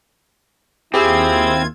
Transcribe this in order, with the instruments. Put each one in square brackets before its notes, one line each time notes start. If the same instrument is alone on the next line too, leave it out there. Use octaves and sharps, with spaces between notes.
[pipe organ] D#2 F4 G#6 [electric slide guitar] C4 [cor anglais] E4 [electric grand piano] G4 G#4 E6